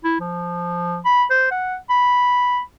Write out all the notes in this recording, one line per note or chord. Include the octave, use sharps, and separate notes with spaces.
E4
F3
B5
C5
F#5
B5